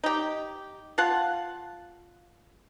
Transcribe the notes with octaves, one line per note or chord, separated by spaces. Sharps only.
D#4 G4
F4 F5 F#5 A5